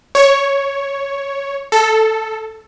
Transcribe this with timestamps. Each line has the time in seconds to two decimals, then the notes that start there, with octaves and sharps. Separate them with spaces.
0.15 C#5
1.72 A4